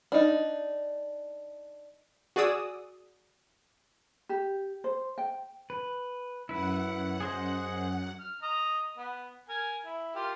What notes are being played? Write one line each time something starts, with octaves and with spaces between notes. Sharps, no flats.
D4 D#4
F#4 G#4 D5 D#6 E6
G4
C5
G5
B4
F#2 E4 B4 F#5
G#4 C5 D#5
F6
D#5 A#5 D#6
B3
A#4 G#5
E4
F4 G4 A#4